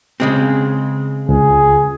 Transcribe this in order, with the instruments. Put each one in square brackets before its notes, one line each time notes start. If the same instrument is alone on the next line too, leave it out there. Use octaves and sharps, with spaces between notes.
[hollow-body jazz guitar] C#3 G#3 C4
[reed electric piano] C#2 [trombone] G#4